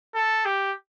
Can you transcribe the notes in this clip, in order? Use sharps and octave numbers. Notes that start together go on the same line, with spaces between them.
A4
G4